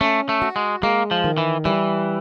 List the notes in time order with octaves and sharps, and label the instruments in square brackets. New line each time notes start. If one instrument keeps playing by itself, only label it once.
[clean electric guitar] A3 [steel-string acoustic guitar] C#4
[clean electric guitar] A3
[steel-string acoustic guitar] F#4
[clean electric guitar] G#3
[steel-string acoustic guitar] G#3 [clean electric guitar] A#3
[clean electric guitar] F3
[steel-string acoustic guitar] D#3
[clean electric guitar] E3
[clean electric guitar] E3 [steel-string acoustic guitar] G3